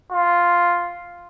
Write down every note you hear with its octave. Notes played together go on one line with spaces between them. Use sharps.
F4